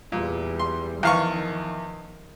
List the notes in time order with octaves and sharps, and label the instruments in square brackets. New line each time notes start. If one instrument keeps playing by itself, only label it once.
[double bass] E2 G3 [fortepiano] A#2
[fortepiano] C6
[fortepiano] E2 F5 C#6 [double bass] D#3 F3